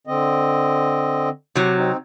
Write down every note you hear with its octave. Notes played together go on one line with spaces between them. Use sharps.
D3 C4 D#5
C3 F#3
C4 D#4